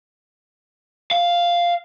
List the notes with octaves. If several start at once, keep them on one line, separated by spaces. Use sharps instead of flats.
F5